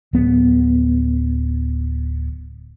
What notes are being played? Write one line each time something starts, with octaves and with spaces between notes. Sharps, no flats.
D1 B3